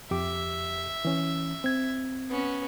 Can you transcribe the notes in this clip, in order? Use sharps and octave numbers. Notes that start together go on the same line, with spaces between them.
F2 G4 E5 D6
E3 C#4
C4 G#6
B3 C#4